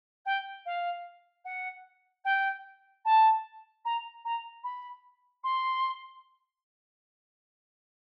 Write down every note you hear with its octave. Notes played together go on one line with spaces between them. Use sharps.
G5
F5
F#5
G5
A5
A#5
A#5
B5
C6